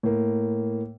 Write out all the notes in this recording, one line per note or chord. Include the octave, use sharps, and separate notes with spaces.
A2 A#3